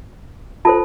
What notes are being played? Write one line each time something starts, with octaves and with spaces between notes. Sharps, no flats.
F4 A4 C5 A5